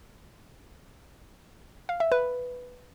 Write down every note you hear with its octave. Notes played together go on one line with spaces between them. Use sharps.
F5
E5
B4